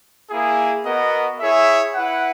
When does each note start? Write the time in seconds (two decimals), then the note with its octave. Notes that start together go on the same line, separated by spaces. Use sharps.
0.31 A#3 E4 G#4
0.85 B3 F#4 A#4 D#5
1.39 E4 G#4 C#5 E5
1.94 E4 B4 F#5